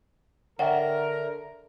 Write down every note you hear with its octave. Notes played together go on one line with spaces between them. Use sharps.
D3 A#4 C#5 D5 E5 F#5 G5